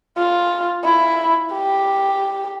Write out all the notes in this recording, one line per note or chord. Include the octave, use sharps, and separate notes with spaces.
F4
E4
G4